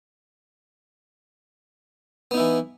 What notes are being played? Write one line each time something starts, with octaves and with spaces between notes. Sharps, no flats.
E3 B3 D#4 E4